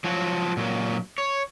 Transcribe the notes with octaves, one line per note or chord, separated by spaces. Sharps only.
F3 F#3 F#4
A#2 F#3
C#5